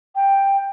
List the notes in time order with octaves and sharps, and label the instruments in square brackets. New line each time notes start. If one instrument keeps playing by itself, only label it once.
[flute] G5